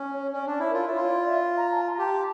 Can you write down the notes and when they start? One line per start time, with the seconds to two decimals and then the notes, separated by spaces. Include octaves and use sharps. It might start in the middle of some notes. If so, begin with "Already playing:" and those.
Already playing: C#4
0.13 C#5
0.26 C#5
0.33 C#4 D5
0.47 D4 C#5
0.60 E4
0.70 F4 A#4
0.86 E4 C#5
0.97 F4
1.07 D5
1.25 E5
1.57 A#5
1.72 A5
1.85 F5
1.94 A#5
1.98 G4 A5